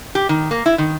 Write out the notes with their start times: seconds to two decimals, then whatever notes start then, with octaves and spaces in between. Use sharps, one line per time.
0.15 G4
0.29 D#3
0.51 A#3
0.66 E4
0.78 D#3